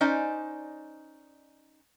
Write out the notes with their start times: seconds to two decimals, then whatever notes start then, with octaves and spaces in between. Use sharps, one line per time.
0.01 C#4 D#4 C5 D5 D#5 G#5